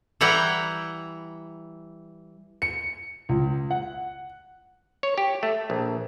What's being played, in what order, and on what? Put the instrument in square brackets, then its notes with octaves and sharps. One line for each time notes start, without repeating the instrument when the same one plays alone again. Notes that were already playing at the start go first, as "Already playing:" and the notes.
[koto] E3 G3 E4 F#5 G5 A#5
[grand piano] C#7
C#2
F#5
[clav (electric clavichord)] C#5
G4
A3
A#1